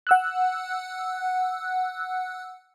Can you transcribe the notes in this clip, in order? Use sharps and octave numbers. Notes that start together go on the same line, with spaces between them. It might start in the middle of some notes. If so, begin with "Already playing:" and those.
F#5 E6 F#6